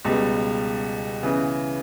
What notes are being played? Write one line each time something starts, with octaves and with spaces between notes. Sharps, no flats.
C#2 B2 G3
C#3 E3 B3